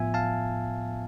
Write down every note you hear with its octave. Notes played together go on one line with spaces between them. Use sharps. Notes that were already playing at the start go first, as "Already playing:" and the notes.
Already playing: A2 F3 B3 F4 E5 G#5
F5 A5